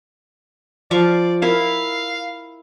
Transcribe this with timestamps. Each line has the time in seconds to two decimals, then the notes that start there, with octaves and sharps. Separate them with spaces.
0.91 F3 D5 F5 C#6
1.42 E4 A#4 F5